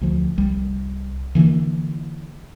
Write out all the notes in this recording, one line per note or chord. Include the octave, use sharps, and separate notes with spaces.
D2 F3
C2 G3
D3 E3 G3 A#3